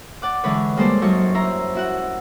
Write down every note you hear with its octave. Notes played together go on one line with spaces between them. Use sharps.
D5 F#5 D6
D3 E3 G#3 B4 C#5
G3 G#3 A#3 A4 C5 D5
F#2 F#3 D#4 A4 C5 C#6
E4 C5 A#5
E4 F#4 F#5